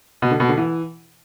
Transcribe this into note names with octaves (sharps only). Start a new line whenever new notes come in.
B2
D3
B2
D3
E3